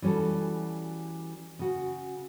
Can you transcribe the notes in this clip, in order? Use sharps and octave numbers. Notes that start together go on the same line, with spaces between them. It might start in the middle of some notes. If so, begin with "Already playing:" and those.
E3 G3 C#4 F#4 A4
C#3 F#4